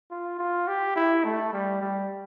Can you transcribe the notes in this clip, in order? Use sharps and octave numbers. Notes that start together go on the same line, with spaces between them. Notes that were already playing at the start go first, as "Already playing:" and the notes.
F4
F4
G4
E4
A3
G3
G3